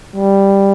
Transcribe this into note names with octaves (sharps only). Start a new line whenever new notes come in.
G3